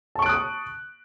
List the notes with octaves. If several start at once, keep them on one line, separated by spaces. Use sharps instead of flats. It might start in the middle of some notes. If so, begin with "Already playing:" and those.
A5 C#6 D#6 F#6 D7